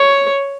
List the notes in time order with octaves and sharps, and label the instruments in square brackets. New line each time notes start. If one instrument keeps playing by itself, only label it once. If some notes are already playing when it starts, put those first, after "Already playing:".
Already playing: [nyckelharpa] C#5